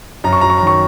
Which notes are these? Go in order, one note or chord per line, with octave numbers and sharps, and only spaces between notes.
F#2 A#5
C#6
F#3 A#5
C#6
A#5
D#3 C#6